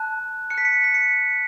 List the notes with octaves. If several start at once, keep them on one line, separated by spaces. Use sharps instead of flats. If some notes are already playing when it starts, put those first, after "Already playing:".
Already playing: A5 F#6
A5 F#6 C#7
B6
C#7
B6
C#7